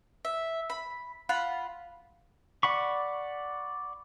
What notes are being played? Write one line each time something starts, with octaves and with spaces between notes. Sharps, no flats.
E5
B5
F4 F5 F#5 B5
D5 F#5 B5 C#6